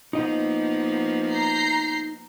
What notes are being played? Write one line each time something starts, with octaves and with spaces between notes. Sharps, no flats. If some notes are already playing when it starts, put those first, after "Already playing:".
F3 A#3 B3 D#4 D#5
A#5 G6 C7